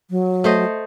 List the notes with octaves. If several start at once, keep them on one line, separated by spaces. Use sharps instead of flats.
F#3
A3 C5 D#5